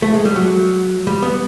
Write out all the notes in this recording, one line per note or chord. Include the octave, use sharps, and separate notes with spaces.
A3
G#3
G3
F#3
G3
B3